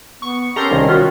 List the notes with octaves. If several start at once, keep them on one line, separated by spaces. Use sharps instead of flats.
B3 C#6
C#4 G4 A4 A#4 A#5 C6
C2 D#3
C#4 F4 F#4